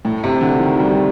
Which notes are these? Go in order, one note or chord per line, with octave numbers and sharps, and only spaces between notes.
A2
C3
D3
D#3
G3